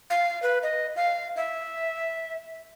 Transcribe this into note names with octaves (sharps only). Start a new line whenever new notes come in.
F5
B4
D#5
F5
E5